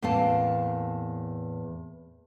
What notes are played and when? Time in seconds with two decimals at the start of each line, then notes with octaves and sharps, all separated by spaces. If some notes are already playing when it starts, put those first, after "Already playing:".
0.02 E2 A2 A#3 C4 F5 A5